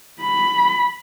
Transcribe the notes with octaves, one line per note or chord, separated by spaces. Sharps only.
B5